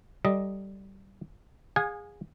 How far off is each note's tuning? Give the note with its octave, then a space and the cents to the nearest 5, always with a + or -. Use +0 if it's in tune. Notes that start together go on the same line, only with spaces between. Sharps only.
G3 -15 A4 +0 D#5 +0
G#4 -20 F5 +40 G#5 +0